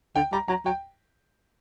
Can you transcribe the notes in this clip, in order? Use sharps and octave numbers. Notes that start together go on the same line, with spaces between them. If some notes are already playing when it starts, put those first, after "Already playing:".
D3 G5
G3 A#5
F#3 A#5
F#3 G5